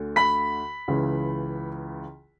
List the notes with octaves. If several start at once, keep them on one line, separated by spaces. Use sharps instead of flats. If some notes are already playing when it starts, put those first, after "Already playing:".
Already playing: D2 D3
B5 B6
C#2 C#3 E3